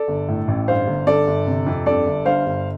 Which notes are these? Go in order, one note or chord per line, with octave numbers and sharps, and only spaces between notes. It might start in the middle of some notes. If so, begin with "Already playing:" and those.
Already playing: A4 D5
G1
A2
A1
G2 C5 F5
G1
G2 A4 D5
G1
C3
F2
G2 A4 D5
G1
G2 C5 F5
G1